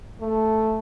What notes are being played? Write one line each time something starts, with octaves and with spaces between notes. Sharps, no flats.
A3